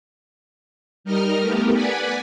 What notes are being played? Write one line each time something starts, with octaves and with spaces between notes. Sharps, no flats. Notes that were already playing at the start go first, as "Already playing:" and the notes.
G3 D#4 A#4 D#5 F6
A3 B3 G4 A#4
B4 D5 F#5 G#5 B5